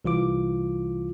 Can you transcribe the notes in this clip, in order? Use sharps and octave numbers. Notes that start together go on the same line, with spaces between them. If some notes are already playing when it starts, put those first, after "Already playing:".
C2 E3 F4 D6